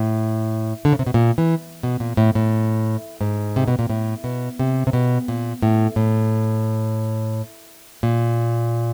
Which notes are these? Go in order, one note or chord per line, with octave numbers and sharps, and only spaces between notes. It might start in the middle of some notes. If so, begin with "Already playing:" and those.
Already playing: A2
D3
C#3
C3
B2
A#2
E3
B2
A#2
A2
A2
G#2
C3
B2
A#2
A2
B2
C3
C3
B2
A#2
A2
A2
A#2